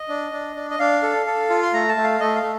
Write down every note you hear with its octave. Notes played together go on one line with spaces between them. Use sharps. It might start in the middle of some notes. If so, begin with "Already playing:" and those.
Already playing: D#5
D4
D4
D4
D#5
D4 F5
A4
A4
F4
C6
A3 A#5
A5
A3
F5
A3 D#5
F5
A3